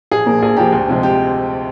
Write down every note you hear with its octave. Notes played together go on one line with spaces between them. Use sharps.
A#1 G#4
A#2 F3 A#3
A#1 G#4
A#2 F3 A#3 G4
D2
C3 F3 G#3
G4